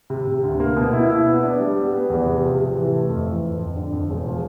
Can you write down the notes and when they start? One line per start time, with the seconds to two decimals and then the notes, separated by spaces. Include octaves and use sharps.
0.10 C3
0.27 C3
0.43 D2
0.60 A#3
0.77 B2
0.93 E4
1.10 E4
1.26 B3
1.43 D4
1.60 G3
1.76 B3
1.93 B3
2.10 E2
2.26 C3
2.43 F3
2.59 C3
2.75 E3
2.92 A3
3.09 F2
3.26 E3
3.43 F2
3.59 F2
3.76 D3
3.92 F2
4.09 E1
4.26 F3